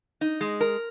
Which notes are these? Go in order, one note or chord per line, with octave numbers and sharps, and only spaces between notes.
D#4
G#3
A#4